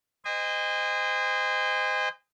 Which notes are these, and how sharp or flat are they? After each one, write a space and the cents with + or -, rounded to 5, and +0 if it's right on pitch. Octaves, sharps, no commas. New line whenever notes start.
C5 -25 D#5 -10 G#5 -40